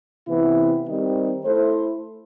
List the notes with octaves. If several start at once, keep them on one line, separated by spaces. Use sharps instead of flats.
C3 E3 B3 E4 B4
D#3 G3 C4 D#4 G4
A3 E4 A4 C5